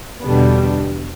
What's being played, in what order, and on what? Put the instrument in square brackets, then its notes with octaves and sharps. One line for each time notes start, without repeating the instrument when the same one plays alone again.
[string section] E2 D3 G3 B3 D4 [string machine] B2